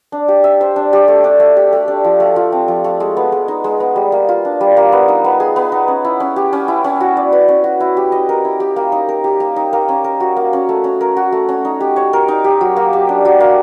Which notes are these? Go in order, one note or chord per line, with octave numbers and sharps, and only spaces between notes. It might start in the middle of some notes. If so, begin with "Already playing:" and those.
D4
G4
E5
C5
D4
G4
A3
D4
A3
G4
A3
D4
F3
A3
F3
C4
F3
A3
G#3
B3
G#3
D#4
G#3
B3
G3
A#3
F4
D4
G3
A#3
B3
D#4
B3
G#4
B3
D#4
C#4
E4
C#4
G4
C#4
E4
C#4
F#4
D5
B4
C#4
F#4
E4
G4
D#5
A#4
E4
G4
A#3
D#4
A#4
G4
A#3
D#4
A#3
C#4
A#4
F#4
A#3
C#4
A3
C#4
A#4
F#4
A3
C#4
D#4
G4
C#5
A#4
D#4
G4
F#3
A#3
G4
D4
F#3
A#3